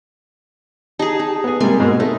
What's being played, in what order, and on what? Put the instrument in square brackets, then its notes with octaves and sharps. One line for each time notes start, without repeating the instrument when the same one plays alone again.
[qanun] D#4 G#4 [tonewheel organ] G4 A5
[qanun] D#4
[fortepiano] B3 G#4
[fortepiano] C3 G3 [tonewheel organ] G#3 A#3 A#4 [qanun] G#5
[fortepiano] G#2 B2
[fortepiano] A3 [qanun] D#4